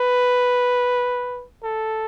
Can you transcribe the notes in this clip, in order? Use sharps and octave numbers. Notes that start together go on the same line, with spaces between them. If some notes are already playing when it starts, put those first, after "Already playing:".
Already playing: B4
A4